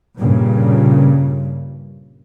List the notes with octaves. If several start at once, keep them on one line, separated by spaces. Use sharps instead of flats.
G2 A#2 C#3